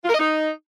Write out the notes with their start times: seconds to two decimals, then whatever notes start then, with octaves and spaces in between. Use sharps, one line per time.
0.04 F4
0.09 A#4
0.14 D#5
0.19 D#4